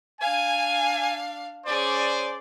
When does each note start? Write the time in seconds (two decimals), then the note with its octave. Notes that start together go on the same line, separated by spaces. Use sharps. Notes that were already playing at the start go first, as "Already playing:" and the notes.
0.21 D4 F5 G#5
1.66 C#4 G#4 C5 D5